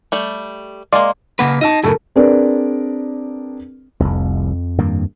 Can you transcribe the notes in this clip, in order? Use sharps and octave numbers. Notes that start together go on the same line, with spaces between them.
G3 A3
G#3 A#3 D5 F5 C6
C#3 A#3 B4 F#5
D#4 D#5 E5 A5
F#2 A2 C#3 A4 A#4
C4 D4 G#4 A#4 B4 D5
F1 C2 F2
G2 D#3 A#3